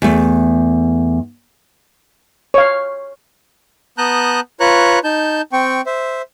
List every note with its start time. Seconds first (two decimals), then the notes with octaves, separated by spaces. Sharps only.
0.02 E2 A3
2.54 C#5 F5
3.98 B3 A5 A#5 D#6 F#6 G6
4.60 F4 B4 C#5 A#5 C#6 F#6
5.04 D#4 A5 G6
5.53 C4 G5 C#6
5.86 C5 E5